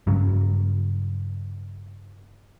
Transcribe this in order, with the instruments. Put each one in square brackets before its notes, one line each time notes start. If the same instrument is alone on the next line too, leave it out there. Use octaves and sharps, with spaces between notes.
[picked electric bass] G2 C#3 F#3